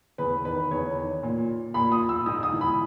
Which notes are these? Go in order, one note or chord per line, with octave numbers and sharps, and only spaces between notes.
E2 B4
D#3 B4
E2 C#5
D#3
A#2
A#2 B5
D#6
E6
G#2 D#6
D#6
E3
B5